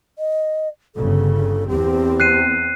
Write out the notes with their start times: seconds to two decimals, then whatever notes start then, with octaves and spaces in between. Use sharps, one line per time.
0.19 D#5
0.95 G1 C#3 A4
1.69 E2 C4 G4
2.20 F#6 C7 D#7